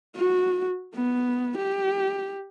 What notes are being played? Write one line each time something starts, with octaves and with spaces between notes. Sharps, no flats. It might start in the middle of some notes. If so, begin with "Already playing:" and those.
F#4
B3
G4